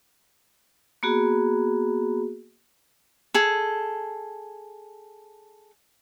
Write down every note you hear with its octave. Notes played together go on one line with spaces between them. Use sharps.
A#3 B3 F#4 G#4
G#4 A4